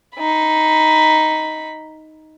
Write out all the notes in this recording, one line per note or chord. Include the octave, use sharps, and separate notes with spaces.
D#4 B5